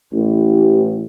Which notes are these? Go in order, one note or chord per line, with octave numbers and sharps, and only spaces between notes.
A1